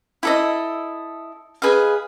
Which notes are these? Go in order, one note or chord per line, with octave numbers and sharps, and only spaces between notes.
E4 A4 D#5
G#4 B4 D#5 F5